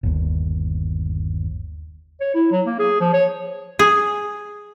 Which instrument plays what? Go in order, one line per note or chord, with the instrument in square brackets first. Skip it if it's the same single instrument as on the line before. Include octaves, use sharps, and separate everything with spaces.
[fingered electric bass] G1 D#2
[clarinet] C#5
E4
F#3
A#3
G#4
F3
C#5
[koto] G#4